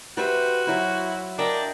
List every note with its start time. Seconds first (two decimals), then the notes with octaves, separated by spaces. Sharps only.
0.17 F#4 G4 B4 C5 E5
0.67 F#3 E4 C5
1.39 D4 A#4 D#5 E5 G5